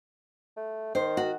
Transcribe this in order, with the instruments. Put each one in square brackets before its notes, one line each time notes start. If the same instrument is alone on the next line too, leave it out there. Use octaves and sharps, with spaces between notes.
[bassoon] A3
[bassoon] D#3 [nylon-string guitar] C5
[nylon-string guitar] F#4